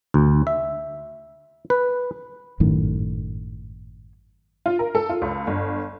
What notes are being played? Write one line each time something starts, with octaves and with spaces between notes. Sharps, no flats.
D2
E5
B4
G#1 F#2 A2 D#3
F4
A#4
A4
F4
C#2
G1